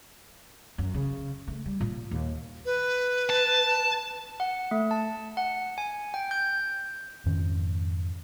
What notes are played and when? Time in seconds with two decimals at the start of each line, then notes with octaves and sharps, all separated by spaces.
0.78 F#2
0.94 C#3
1.48 A3
1.66 G3
1.81 A#2
2.11 D#2
2.65 B4
3.29 A5
4.40 F#5
4.71 A3
4.91 A5
5.37 F#5
5.78 G#5
6.14 G5
6.31 G6
7.25 F2 G#2 D#3 C#4